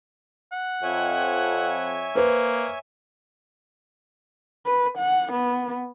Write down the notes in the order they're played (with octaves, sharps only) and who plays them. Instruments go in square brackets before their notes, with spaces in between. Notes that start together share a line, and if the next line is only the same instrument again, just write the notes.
[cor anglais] F#5
[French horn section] F2 [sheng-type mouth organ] C#5 E5 G#5
[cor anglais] A#3 [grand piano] B4 C5
[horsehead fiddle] B4
F#5
B3